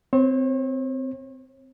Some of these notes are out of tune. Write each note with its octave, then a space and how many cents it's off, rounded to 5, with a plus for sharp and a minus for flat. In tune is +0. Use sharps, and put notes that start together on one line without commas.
C4 -15 C#5 -40